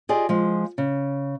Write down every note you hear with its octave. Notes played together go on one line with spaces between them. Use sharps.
F4 G4 G#4 D5 D#5
F3 G#3
C#3